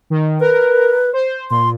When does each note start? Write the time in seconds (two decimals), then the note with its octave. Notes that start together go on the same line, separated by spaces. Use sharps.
0.10 D#3
0.40 A#4 B4
1.13 C5
1.51 A#2 C6